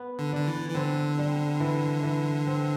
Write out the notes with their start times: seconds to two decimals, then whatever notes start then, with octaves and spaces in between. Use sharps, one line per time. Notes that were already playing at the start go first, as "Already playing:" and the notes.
Already playing: B3
0.19 D3
0.33 D3 D5
0.47 E3
0.70 E3
0.75 D3 C4
1.18 G3
1.60 E3
2.03 E3
2.47 C4